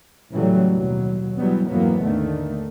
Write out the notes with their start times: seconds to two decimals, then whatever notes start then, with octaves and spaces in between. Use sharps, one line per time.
0.33 A2 C#3 E3 F#3 G3 A3
0.72 D#2 B2 F#3
1.37 E3 F#3 G3 B3
1.69 F2 G#2 E3 F#3 A#3 B3
2.01 D#2 D3 D#3 A3